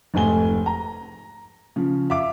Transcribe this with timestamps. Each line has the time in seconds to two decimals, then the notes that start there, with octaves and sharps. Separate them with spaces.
0.14 F1 G#2 A3 G#5 G7
0.66 A#5
1.76 C#3 F3
2.10 E5 F5 D6